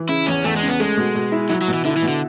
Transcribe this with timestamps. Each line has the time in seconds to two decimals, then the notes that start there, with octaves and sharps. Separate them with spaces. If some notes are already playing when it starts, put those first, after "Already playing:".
Already playing: E3
0.09 C#3 E4
0.26 E2 C#4
0.44 E2 A3
0.56 G#3
0.63 C#3
0.68 B3
0.80 G#3 A3
0.97 B2
1.15 B2
1.32 E4
1.49 F#3 E4
1.61 F#3
1.68 B2
1.73 E3
1.85 D3 E4
1.96 E3
2.02 B2
2.08 D3